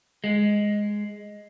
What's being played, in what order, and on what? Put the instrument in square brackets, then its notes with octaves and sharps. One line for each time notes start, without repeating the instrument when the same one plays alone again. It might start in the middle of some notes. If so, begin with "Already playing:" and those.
[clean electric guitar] G#3